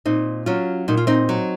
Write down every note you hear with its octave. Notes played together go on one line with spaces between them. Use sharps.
A#2 C4 D#4
F#3 C#4 F4
A#2 D#4
F4
C4 D#4
F#3